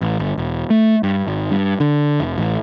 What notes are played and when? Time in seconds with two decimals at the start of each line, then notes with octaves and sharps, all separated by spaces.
0.01 A1
0.19 G1
0.38 E1
0.70 A3
1.03 G2
1.27 G#1
1.51 G2
1.80 D3
2.20 F1
2.38 A1